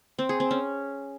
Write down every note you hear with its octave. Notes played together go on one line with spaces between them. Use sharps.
C4
G#4
C4
C#4